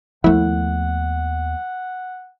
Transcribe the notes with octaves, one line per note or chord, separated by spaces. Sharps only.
D#2 F3 A3 B3 E4 F#5